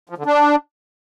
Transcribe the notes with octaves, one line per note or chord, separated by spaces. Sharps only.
F3
D3
D4